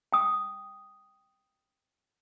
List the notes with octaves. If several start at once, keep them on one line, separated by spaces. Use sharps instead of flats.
G5 D#6